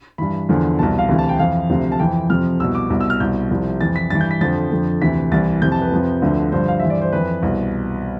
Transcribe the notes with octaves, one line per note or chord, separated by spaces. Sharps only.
G2 E3 B5
E2 D3 F3
C2 B2 A5
F5
D2 C3 E3
A5
G5
F2 E3 F5
D2 C3 F3
A5
F2 E3 G5
F2 C3 F3 F6
C2 B2 E6
D6
C2 B2
E6
F6
C2 B2 G6
C2 C3 F3
F2 E3 A6
B6
G2 E3 A6
G6
B6
F2 D3 F3 A6
F2 D3 F3
D2 C3 E3 B6
C2 C3 E3 A6
F2 C3 E3 G6
A5
B4
F2 C3 F3
D2 D3 F3
G2 D3 F3 C5
F5
G2 E3 E5
D5
C5
F2 E3 B4
C2 B2